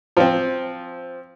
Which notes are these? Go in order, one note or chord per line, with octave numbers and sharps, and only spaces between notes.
F3 C4